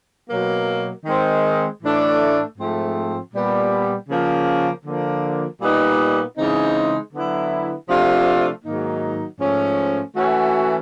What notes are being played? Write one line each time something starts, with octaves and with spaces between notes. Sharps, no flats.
B2 F#3 A#3
D#3 G#3 C4
A2 E3 A3 D4
G#2 F3 A3 C4
A#2 G3 B3
C#3 F3 A#3
D3 F3 A#3
A#2 G3 B3 D#4
C#3 E3 G#3 C4 D#4
D3 F#3 B3 E4
C3 F3 A3 D4 F4
G#2 D#3 F#3 A#3 D#4
G#2 F3 A3 C#4
E3 A3 C#4 F#4